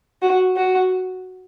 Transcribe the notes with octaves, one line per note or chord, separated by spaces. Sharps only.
F#4
F#4